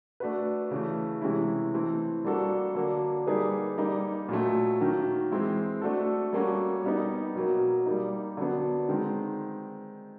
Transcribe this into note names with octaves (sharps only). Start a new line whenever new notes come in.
A3 D4 F#4 B4
C#3 E3 A3
C3 E3 G#3 C#4 E4
E3 A3 C4
G3 A#3 D4 F#4 A4
D3 F#3 A#3
G3 A#3 D#4 G#4 B4
G3 A#3 D#4
A#2 F#3 A3
D#3 F#3 A#3
E3 G#3 C4 E4
A3 D4 F#4 A4
G3 A#3 C#4 F#4 A4
G3 B3 D#4
B2 F#3 A#3
G3 A#3 D#4
D3 F#3 B3
D#3 G#3 C4